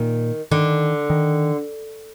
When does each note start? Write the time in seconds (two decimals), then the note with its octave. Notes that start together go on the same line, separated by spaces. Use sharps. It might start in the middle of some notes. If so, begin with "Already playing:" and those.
Already playing: A#2 D#3
0.51 D3 D#3
1.10 D#3